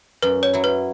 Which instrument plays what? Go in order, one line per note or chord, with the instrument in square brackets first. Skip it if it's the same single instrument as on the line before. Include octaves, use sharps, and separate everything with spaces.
[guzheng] F#2 [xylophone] B4
[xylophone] C#5
[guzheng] F#3 E4
[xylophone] B4